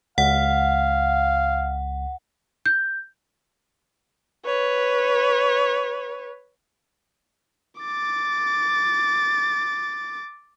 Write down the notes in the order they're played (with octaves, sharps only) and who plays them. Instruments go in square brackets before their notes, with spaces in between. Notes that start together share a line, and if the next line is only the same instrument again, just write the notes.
[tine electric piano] C#2 [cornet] F5 [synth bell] F#5
[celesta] G6
[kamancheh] B4 C#5
[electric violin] D6 A6